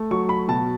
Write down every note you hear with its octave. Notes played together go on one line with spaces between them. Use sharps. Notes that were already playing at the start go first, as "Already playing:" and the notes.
Already playing: A3
F#3 C#6
B5
B2 A5